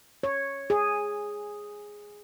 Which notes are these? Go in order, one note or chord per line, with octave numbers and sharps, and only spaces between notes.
C#5
G#4